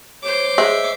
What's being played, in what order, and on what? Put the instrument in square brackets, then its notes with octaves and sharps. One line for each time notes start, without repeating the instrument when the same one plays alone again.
[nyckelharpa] C5 D6 [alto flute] C#5
[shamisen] G#3 [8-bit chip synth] E5